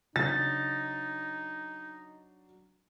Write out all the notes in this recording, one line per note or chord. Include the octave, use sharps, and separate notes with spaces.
C#3 F#3 D4 D#4 A6